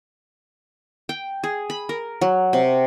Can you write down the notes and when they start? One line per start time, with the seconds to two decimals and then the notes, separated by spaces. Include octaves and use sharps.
1.09 G5
1.44 G#4
1.70 B5
1.89 A#4
2.21 F#3
2.53 C3